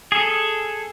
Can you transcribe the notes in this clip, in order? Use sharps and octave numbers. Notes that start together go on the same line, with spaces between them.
G#4 A4